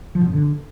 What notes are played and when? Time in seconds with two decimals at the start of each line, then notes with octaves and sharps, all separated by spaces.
0.15 F3
0.21 B2
0.27 F#2
0.33 D3